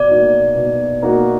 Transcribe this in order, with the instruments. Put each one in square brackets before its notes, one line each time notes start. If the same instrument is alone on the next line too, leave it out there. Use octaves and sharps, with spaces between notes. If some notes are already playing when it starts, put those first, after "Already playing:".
Already playing: [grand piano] B2 [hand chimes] D5
[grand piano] A#3 D#4 F#4
B2
A#3 D#4 F#4